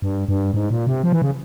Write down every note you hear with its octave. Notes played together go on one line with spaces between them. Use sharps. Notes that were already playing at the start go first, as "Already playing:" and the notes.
G2
G2
G#2
A#2
C3
F3
E3
C#3